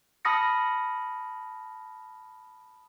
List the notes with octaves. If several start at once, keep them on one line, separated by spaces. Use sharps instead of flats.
A5 B5 D#6 F6 A#6 C#7